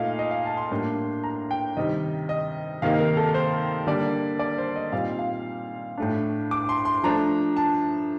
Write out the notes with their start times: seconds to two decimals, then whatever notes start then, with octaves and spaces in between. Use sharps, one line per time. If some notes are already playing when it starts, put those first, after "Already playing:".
Already playing: A#2 A3 D#4 F5
0.19 D#5
0.31 F5
0.45 A5
0.57 C6
0.71 A2 G3 A#3 D4
1.24 A#5
1.51 G5
1.77 C3 D#3 G3 D#5
2.29 D#5
2.82 C3 D#3 A#3 D#4 F5
2.99 A#4
3.17 A4
3.34 C5
3.87 D3 G3 A#3 D5
4.39 D5
4.58 C5
4.76 D#5
4.92 A#2 G3 C4 D#4 F5
5.19 F5
5.98 A2 A3 D4
6.51 D6
6.69 C6
6.85 C6
7.03 F3 A3 D4 A#5
7.57 A5